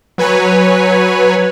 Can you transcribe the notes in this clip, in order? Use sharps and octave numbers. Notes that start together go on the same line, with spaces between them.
F#3 B4 C#5 G#5